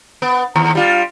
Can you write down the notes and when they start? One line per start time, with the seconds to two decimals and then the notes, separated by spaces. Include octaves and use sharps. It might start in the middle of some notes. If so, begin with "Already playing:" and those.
0.22 B3
0.56 D#2
0.75 G3 F4